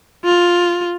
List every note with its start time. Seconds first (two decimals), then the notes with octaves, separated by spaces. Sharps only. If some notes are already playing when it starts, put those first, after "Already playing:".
0.24 F4